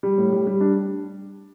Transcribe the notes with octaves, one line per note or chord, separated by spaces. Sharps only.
G3
A2
G3
G3
D4